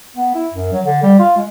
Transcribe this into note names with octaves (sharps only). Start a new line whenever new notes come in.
B3
E4
F#2
F#3
D3
G3
F4
G#3